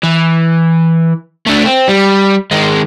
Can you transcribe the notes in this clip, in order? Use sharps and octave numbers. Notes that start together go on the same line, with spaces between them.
E3
A3 D4
C4
G3
D#3 G#3